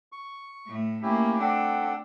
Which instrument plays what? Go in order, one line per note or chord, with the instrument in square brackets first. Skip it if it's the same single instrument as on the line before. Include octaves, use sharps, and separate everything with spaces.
[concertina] C#6
[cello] A2 A3
[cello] A3 A#3 [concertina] C#4 E4 G4
[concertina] C4 A4 F#5 [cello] D4